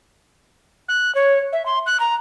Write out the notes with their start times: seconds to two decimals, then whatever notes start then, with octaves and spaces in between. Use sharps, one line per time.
0.89 F#6
1.15 C#5
1.53 E5
1.66 C6
1.86 F#6
2.00 A#5